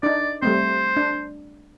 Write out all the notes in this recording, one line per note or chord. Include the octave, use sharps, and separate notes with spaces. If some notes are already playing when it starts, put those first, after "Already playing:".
D4 D#4 D5
G3 A3 C4 C5
D4